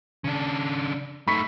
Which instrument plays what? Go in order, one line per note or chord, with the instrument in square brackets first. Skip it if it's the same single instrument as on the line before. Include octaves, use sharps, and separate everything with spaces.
[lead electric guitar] C#3 D4
[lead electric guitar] A3 D#4 [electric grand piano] B5 C#6 B6